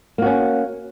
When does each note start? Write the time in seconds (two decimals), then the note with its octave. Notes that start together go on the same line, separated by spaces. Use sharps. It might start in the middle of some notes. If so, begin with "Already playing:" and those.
0.18 A#3
0.22 F#4
0.26 C#4